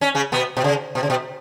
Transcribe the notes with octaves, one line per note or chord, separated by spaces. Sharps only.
C#4
C#3 C#4
B2 B3
B2
C#3
B2
C#3
B2